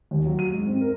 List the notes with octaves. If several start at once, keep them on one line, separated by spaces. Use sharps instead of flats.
D#2
F#3
D#7
G#2
C4
A#4